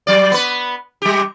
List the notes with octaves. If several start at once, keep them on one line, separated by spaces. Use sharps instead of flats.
F#3 D5
B3 B4
G3 G4